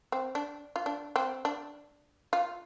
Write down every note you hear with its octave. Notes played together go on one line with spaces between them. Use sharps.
C4
D4
F4
D4
C4
D4
F4